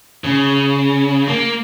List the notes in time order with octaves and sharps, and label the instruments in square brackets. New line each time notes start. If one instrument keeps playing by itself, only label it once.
[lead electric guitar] C#3
A#3